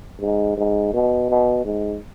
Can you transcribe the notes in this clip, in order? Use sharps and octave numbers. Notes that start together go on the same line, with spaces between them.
G#2
G#2
B2
B2
G#2